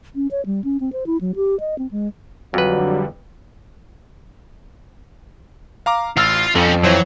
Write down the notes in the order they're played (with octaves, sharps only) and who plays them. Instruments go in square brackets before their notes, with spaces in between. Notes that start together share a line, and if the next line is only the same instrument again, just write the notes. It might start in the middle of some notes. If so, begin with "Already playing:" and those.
[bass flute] C#4
C#5
G3
C#4
C4
C5
E4
F#3
G4
D#5
C4
G#3
[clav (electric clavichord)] F2 B4 [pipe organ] D3 G3 [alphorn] F#3
[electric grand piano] F5 A#5 D6
[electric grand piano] A1 E6 A6 [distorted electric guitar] F4 F5
[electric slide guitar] F2 [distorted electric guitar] C4 C#4 [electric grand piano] A4
[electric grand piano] E3 C5 C#5 [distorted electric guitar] F#3